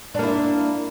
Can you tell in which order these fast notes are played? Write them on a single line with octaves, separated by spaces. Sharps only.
D4 A#3 E4